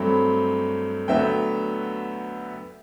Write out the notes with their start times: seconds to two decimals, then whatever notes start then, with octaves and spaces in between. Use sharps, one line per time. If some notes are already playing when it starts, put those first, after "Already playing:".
Already playing: G2 F#3 A3 C4 G5 B5
1.08 D2 D3 F#3 B3 E5 G5